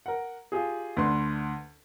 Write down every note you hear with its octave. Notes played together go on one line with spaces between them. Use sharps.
A#4 F#5
F4 G4 G#4
D2 D4 B4 C6